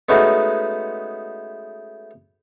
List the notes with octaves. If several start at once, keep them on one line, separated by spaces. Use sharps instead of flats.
G#3 A3 B3 C#4 D#4 F#4